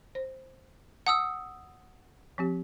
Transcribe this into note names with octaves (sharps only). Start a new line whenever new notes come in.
C5
F#5 A5 D#6 E6
F3 C4 G4